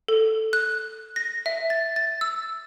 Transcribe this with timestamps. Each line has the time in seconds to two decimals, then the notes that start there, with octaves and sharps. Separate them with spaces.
0.08 A4
0.53 F#6
1.16 A#6
1.46 E5
1.70 A6
1.96 A6
2.21 E6